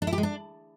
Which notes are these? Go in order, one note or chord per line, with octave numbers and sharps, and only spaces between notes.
D4
E4
G4
G#3
D4